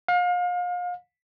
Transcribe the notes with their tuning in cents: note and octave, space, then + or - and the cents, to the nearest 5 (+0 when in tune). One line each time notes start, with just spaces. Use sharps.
F5 +35